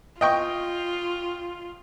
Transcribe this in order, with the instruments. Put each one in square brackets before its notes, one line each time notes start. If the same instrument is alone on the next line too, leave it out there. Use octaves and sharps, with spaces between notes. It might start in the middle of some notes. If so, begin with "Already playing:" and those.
[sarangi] F4 [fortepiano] D#5 G5 C#6